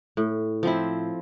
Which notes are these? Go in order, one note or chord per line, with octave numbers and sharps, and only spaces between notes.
A2
F3 C4 E4